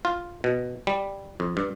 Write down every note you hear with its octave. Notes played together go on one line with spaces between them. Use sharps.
F4
B2
G3
F2
G2